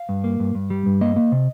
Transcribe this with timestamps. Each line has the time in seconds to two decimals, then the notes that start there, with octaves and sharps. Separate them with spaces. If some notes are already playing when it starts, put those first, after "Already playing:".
Already playing: F5
0.09 G2
0.24 A#3
0.40 G2
0.55 G2
0.70 G3
0.86 G2
1.01 A#3 D#5
1.16 A#3
1.32 C3